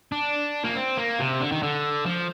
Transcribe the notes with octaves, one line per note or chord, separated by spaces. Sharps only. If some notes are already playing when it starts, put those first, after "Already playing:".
D4
A#3
C4
A#3
C3
D3
D#3
D3
F3